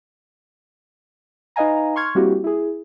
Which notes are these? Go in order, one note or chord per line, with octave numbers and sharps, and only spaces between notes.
D#4 B4 D#5 F5 G#5 A#5
C6 C#6 F6 G#6
G3 A#3 C4 E4 F#4 G4
E4 G#4